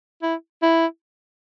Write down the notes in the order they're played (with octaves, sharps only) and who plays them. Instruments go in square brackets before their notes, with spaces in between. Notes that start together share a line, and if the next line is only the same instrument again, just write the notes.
[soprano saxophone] E4
E4